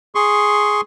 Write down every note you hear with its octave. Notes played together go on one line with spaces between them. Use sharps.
G#4 C6 C#6